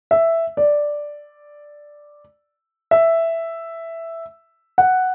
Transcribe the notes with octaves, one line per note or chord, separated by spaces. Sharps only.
E5
D5
E5
F#5